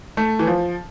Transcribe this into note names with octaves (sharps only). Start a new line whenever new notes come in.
A3
E3
F3